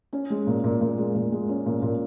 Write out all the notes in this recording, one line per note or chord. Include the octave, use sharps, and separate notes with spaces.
C#4
G#3
A#2
A#2
A#2
G#3
A#2
G#3
C#4
A#2
A#2